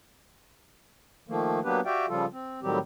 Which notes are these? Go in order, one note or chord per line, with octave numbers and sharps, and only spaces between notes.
D#3 F3 A3 A#3
F#3 A#3 B3 D4 G4 B4
F#4 G4 D5 E5 F5 G5
C#3 F3 G3 F4 A4
C4
A2 D#3 F#3 G3 C4 G4